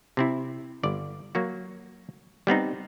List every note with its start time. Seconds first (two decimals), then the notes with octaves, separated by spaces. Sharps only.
0.17 C3 C4 E4
0.84 G1 D5
1.35 F#3 A#3 F#4
2.47 G3 B3 C4 D#4